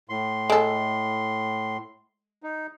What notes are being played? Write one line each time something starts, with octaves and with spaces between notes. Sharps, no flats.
A2 C6
G#3 A4
D#4